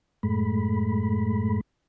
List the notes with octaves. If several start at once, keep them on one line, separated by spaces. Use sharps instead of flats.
F#2 A2 G#3 A3 B5